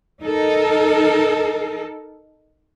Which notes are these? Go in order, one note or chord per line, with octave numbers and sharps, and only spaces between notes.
D#4 A4 A#4